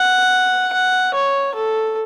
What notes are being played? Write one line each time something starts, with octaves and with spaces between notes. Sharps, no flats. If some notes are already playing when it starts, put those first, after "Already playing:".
Already playing: F#5
F#5
C#5
A4